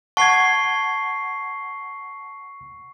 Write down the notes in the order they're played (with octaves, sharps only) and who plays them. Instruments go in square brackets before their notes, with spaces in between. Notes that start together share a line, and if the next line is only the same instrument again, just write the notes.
[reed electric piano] F#5 G#6 [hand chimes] A5 [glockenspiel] C#6 C7 G7